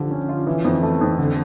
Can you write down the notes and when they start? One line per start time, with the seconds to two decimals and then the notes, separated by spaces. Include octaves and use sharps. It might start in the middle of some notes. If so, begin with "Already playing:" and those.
Already playing: D3 F3 G4
0.11 C#4
0.29 F4
0.47 E3
0.65 F2
0.83 A3
1.01 F2
1.18 D3